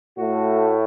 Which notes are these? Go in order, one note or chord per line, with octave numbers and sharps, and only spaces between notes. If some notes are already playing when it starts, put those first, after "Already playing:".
A2 A3 F#4